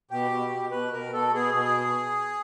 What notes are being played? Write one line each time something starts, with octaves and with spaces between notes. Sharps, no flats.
B2 G4
B2
B2
B2 B4
B2 A#4
B2 A4
B2 G#4
B2